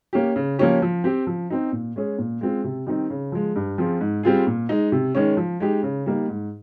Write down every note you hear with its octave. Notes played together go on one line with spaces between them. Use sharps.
A#3 C#4 G4
C#3
F3 A#3 C#4 G4
F3
C4 G4
F3
C4 D#4
A#2
G#3 C#4 G#4
A#2
G#3 C4 F4
C3
D#3 G3 C4 D#4
C#3
F3 G#3
G2
F3 C4 F4 G#4
G#2
G3 C4 F4 G#4
A#2
G#3 D#4
C3
D#3 G#3 C#4
F3
G#3 D#4 G4
C#3
G3 A#3 D#4
G#2